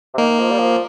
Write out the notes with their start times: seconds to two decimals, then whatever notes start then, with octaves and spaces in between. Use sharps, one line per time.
0.14 C3
0.17 D#3 A#3
0.39 F3
0.51 G3
0.59 F3